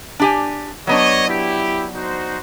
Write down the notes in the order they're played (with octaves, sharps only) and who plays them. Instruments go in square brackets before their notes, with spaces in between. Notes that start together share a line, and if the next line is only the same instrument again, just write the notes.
[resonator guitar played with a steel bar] D4 G4 G#5
[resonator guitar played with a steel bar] F#3 B3 D4 [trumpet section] C#5 D#5
[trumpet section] E4 G4
D#4 F#4 C5